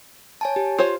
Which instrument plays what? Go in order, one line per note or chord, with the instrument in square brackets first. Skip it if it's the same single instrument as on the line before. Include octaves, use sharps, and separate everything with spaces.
[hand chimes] C#5 G#5 A5
G4
[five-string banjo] F4 C5 C#5